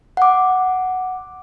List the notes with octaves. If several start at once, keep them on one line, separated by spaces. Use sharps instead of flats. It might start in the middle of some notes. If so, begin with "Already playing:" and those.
F#5 D6